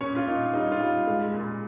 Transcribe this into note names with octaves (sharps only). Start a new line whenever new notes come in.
A#2 C#4 C#5
F4
A#2 D#4
G3 D#4
F4
G3
G#3
A#2